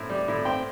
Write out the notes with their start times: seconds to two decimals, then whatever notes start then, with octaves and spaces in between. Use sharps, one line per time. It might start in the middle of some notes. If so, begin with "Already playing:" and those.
Already playing: A2 C4
0.09 G3
0.28 A2
0.45 C4 G5